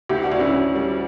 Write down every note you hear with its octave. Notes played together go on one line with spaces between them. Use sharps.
D2 E4 G4
D4 F#4
D2
C#4 E4
D2
G3